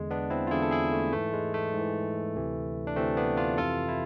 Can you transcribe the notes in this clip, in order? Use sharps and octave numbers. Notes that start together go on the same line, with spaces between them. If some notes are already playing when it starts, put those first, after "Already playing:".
Already playing: E2 D3 G#3
B3 D4
C4 E4
F4
E2 D3 E4 G#4
A4
E4 G#4
A3
G#2 E3 A3
G#3
A3
G#2 E3
D2 C3 E3
D4
D2 C3 E3 A3 C4
B3 D4
D4 F4
F2 C3 E3 F4 A4
E4